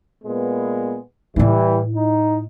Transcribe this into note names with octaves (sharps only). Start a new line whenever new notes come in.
A#2 G#3 B3
A2 E3 G3 E4
D#4